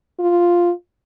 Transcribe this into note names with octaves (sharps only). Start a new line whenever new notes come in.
F4